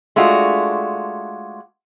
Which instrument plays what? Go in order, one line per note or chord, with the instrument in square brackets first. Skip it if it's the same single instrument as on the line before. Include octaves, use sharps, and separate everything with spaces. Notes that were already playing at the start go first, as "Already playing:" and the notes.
[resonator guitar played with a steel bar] G#3 A3 D4 F4 F#4